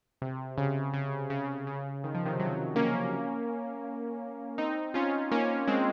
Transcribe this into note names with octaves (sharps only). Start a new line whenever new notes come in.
C3
C#3
C#3
C#3
C#3
D#3
F3
C3 D#3
D#3 F#3
A#3 C#4
C4 D#4
C#4 F4
A#3 C#4
G#3 C4